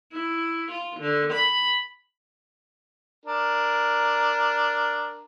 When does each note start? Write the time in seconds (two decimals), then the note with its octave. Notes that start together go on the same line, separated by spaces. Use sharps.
0.12 E4
0.71 F4
1.00 D3
1.32 B5
3.26 D4 A#4